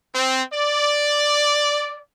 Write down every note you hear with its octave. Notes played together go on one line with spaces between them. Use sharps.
C4
D5